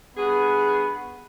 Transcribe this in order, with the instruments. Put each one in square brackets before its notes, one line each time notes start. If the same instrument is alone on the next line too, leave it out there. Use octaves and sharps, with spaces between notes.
[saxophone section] G2 F#4 G#4 [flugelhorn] B3